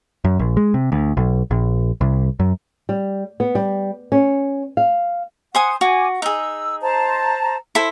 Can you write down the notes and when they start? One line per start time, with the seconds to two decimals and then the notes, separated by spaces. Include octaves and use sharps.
0.24 F#2
0.39 A#1
0.57 G#3
0.74 C3
0.92 D2
1.17 B1
1.51 A#1
2.01 C2
2.40 F#2
2.89 G3
3.40 B3
3.55 G3
4.12 C#4
4.77 F5
5.55 C5 F#5 G#5 D#6
5.81 F#4 G#5 D6
6.22 D#4 G#4 E6
6.81 C5 A5 A#5
7.75 E4 A4 C5